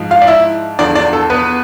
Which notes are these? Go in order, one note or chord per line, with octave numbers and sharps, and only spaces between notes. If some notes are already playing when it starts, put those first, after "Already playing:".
Already playing: G#2 F3
F4 F5
D5
E4 E5
E2 D3 F3 D4 D5
D4 D5
A4
B3 B4